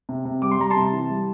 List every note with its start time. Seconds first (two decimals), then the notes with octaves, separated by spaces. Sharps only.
0.09 C3
0.25 C3
0.42 G3 D6
0.51 C6
0.59 G3 A#5
0.70 A5 C6
0.76 C3
0.92 E3
1.10 G3